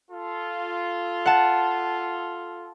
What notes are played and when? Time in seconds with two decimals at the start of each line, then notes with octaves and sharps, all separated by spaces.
0.11 F4 A4
1.26 F#5 A5